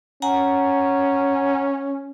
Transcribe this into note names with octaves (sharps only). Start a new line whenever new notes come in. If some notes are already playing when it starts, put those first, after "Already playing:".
C#4 F#5 G#5 A#5